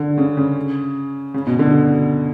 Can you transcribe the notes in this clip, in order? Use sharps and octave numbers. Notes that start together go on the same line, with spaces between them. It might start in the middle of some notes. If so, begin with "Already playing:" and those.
Already playing: D3
C#3
C#3
C#3
B2
D3